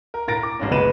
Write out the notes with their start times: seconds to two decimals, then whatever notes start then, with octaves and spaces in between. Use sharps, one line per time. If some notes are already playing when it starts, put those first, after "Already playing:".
0.14 A#4
0.28 A2 A#4 A6 A#6 D7
0.43 D6
0.60 A1 G#2 C#4
0.71 F#1 G#3 B4 D#7 E7